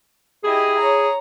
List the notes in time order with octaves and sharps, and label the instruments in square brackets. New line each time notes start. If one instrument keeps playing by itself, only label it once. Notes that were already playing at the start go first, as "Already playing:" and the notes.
[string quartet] E4 G4 D#5 [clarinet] G#4
[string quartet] C#5 A#5